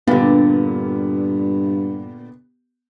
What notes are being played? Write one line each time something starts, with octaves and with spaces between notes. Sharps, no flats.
G2 A#2 D3 B3 G4